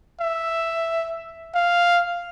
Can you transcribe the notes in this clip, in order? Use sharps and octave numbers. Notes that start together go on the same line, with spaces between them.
E5
F5